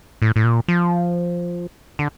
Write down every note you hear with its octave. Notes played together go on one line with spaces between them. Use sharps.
A2
A2
A#2
F3
D3